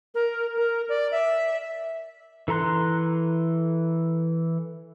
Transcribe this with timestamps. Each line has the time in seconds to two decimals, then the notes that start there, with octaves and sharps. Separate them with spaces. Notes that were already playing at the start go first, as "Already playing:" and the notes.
0.15 A#4
0.57 A#4
0.89 D5
1.12 E5
2.48 E3 A4 A#5 C6 F#6